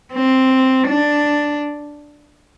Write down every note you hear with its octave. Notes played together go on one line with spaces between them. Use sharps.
C4
D4